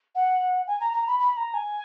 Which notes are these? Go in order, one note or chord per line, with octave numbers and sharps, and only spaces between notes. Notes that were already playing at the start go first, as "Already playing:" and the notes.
F#5
G#5
A#5
A#5
B5
B5
A#5
G#5